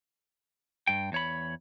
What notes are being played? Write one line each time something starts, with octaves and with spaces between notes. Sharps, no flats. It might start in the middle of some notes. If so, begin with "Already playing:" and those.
G2 G5
E2 C#5 B5